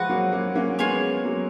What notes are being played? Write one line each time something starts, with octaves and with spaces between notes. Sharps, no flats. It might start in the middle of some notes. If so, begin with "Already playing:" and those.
Already playing: F3 G#3 F#4 B4 F#5
F#3 A#3
A#3 C#4
A#3 C#4
C#4
G#3 B3 F4 G#4 C#5
F#3 A#3